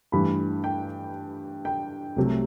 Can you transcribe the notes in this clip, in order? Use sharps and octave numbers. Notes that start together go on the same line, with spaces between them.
G2 E3 A3 B5
G5
G5
C2 C3 F#3 A3